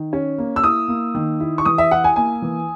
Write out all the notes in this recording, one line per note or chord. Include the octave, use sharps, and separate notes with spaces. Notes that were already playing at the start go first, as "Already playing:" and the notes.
Already playing: D#3
C#4
A#3
E6
E4 D#6
A#3
D#3
E4
C#6
E3 D#6
E5
E4 F#5
G#5
A#3 G#5
E3